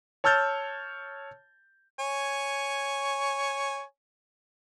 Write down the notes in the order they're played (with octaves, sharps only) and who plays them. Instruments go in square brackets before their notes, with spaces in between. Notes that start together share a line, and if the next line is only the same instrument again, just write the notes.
[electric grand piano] C#5 A5 E6 F6 G6 A6
[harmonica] C#5 G#5